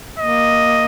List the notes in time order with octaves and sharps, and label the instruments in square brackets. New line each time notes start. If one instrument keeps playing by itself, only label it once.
[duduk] A#3 [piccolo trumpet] D#5